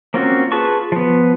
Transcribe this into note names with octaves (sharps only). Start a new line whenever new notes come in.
A#3 C4 C#4 F4 F#4
F4 G#4 B4 A5 C#6
F3 B3